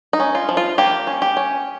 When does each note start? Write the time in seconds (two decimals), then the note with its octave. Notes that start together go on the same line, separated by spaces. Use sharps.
0.13 D#4
0.20 C#4
0.35 F4
0.49 F3
0.57 F4
0.78 A#3 G4
1.07 C#4
1.22 G4
1.37 C#4